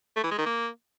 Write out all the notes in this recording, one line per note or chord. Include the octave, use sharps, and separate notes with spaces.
A3
E3
G#3
D#3
A#3